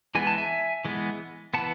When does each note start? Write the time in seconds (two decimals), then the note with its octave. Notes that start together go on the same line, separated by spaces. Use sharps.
0.15 E3 G#3 B3 G#5
0.27 A5
0.38 E5 G#5
0.85 E3 G#3 B3
1.54 E3 B3 F#5 A5